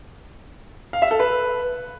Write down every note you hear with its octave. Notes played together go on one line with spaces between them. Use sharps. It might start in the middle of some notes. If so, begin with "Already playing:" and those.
F5
E5
A4
B4